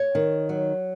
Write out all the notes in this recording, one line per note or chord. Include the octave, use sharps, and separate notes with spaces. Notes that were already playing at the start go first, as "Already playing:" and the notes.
Already playing: C#5
D#3
F#3